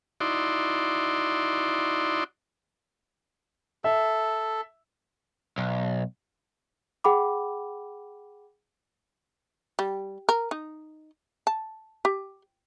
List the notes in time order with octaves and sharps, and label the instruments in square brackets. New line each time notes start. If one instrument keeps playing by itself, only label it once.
[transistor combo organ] D#4 E4 F#4 D5 C6
[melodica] A4 [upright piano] E5
[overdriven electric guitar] B1
[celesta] G#4 F#5 G5 B5 D6
[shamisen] G3
A#4
D#4
A5
G4